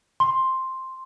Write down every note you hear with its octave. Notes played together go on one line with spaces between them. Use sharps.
C6